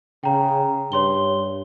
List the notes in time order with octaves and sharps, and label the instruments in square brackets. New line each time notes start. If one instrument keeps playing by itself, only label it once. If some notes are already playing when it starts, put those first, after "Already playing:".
[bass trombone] C#3 [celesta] G5 A#5
[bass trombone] G2 [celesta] C#5 C6 G7